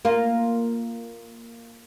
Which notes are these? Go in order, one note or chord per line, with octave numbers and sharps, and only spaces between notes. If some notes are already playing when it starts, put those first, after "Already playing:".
A#3 F4